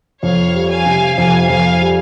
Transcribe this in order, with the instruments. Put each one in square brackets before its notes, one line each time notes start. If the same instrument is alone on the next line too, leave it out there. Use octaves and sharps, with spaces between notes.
[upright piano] F2 [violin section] C#5 F5
[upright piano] G3
[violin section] F5 G#5
[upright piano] C3
[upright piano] F2 [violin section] F5 G#5
[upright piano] F2 [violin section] F5 G#5
[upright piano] G3